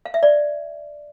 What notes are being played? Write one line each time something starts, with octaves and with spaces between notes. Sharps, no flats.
F5
E5
D5